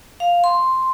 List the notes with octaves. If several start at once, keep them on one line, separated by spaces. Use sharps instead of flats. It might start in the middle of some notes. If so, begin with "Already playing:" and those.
F5
C6